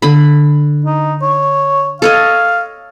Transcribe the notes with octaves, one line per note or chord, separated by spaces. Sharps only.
D3 B5
D#4
C#5
A4 C#5 D#5 F5